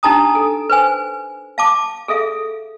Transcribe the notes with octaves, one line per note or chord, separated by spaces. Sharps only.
D4 D#4 G4 A5 A#5 D#6
A4
B4 C5 G#5
F5 A5 D6
G#4 A4 E5 F5